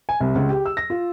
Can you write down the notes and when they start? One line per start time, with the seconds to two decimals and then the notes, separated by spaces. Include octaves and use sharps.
0.09 G#5
0.20 C2
0.35 C#2
0.49 G4
0.66 E6
0.77 A#6
0.90 F4